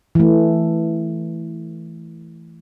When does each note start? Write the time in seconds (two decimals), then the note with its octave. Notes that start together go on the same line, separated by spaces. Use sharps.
0.15 E3 A3